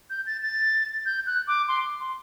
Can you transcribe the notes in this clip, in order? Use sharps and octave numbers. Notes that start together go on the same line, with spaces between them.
G6
A6
A6
G6
F#6
D6
C6
C6